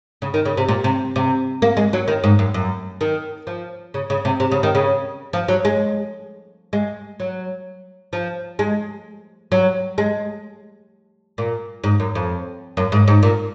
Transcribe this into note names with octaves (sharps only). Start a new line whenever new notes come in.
C#3
D#3
C#3
C3
A#2
C3
C3
A#3
G#3
F#3
D#3
G#2
F#2
F#2
D#3
F3
C#3
C#3
C3
C3
C#3
D#3
C#3
F3
F#3
G#3
G#3
F#3
F3
G#3
F#3
G#3
A#2
G#2
F#2
F2
F#2
G#2
G#2
A#2